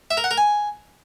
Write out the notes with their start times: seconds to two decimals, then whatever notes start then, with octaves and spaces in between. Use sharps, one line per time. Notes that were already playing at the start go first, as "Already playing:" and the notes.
0.11 E5
0.17 A#4
0.24 F#5
0.31 A#4
0.38 G#5